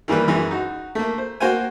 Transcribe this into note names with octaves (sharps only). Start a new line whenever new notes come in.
D#3 E3 G3 A#3 B4
F#2 E3 G#3
D#4 F#4
A3 A#3
C5
A#3 F#4 C5 F5 G5 G#5